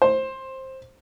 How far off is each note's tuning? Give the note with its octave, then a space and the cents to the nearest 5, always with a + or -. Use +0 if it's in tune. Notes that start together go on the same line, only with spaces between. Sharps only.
C5 +15